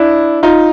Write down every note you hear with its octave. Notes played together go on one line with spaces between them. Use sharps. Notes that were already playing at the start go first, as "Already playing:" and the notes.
Already playing: D4 E4
D#4 F4